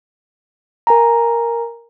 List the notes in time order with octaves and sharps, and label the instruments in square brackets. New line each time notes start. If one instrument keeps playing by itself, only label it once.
[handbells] A#4 G#5 A#5